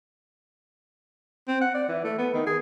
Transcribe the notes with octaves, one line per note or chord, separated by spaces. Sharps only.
C4
F#5
D5
E3
A3
B3
D#3
G#4